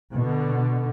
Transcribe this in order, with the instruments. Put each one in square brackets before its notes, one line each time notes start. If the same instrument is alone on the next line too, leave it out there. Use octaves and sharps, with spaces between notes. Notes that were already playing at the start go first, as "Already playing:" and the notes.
[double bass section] B2 D3